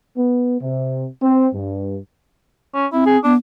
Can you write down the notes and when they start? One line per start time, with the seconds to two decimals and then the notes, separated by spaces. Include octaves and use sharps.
0.16 B3
0.60 C3
1.22 C4
1.53 G2
2.75 C#4
2.93 C4 E4
3.06 G#4
3.24 B3 D4